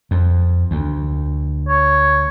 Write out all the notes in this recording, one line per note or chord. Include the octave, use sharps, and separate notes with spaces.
F2
D2
C#5